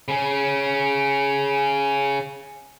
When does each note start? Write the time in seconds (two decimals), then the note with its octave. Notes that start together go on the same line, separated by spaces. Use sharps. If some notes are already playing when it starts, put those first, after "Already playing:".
0.08 C#3 C#4